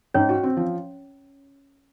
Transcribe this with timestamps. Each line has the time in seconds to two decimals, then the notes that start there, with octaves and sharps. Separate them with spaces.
0.14 G#2 C#4 C#5
0.29 F#4
0.43 C4
0.57 F3